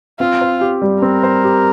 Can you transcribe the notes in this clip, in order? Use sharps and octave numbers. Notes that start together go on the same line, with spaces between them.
C4 F4
C5
G4
G3
C4 A#4
C5
G4